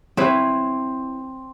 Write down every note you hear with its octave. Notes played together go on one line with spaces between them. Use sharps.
C4 E4 B4 C#5